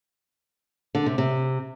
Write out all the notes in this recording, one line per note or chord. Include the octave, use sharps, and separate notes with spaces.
D3
C3
C3